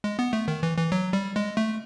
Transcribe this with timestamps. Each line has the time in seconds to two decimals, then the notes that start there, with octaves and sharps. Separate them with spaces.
0.04 G#3
0.19 B3
0.33 A3
0.48 D#3
0.63 E3
0.78 E3
0.92 F#3
1.13 G3
1.36 G#3
1.57 A3